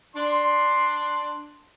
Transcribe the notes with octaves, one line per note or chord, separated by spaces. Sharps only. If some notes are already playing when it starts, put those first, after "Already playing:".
D4 C6